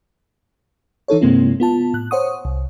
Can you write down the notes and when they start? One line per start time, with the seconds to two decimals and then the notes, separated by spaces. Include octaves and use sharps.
1.08 E3 D#4 A4 C#5
1.21 G2 C3 G#3 A#3 C4 E4
1.60 B3 F4 A5
1.94 A2 F#6
2.11 C5 C#5 F#5 C#6 D#6
2.45 C2